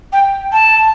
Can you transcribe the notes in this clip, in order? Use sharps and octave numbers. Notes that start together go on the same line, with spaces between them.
G5
A5